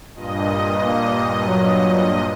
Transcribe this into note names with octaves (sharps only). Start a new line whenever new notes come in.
G2 A#2 D#5
A#3
F#3